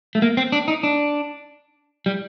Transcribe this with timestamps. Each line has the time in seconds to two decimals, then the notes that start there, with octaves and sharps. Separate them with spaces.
0.15 A3
0.22 A#3
0.37 C4
0.52 D4
0.68 D#4
0.83 D4
2.06 G3